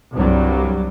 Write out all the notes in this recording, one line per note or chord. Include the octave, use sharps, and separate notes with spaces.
C2 G2 F#3 G3